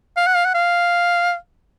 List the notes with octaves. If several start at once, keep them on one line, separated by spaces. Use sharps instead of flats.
F5
F#5
F5
F#5
F5